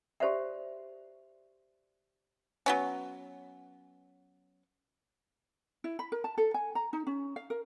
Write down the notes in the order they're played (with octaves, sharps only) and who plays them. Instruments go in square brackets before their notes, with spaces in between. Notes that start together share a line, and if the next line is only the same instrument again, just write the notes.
[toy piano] F#4 G4 C5 D5 E5 F#5
[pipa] F#3 B3 C#4
[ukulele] E4
B5
A#4
A5
A4
G#5
A#5
D#4
C#4
F5
A#4